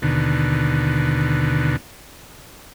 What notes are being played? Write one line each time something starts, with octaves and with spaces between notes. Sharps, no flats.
D#2 B2 D3